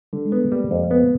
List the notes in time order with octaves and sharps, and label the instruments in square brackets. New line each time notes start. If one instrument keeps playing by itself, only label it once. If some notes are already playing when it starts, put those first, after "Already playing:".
[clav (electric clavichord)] D3 [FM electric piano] G3
[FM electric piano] G#3
[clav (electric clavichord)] B3
[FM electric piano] A3
[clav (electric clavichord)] G3 [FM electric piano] A#3
[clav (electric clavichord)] F2
B3